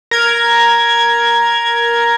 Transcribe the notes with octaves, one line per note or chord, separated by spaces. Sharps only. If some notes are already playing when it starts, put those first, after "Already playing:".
A#4 G#6